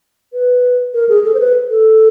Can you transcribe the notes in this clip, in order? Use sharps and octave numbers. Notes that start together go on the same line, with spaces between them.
B4
A#4
G#4
A4
C5
B4
A4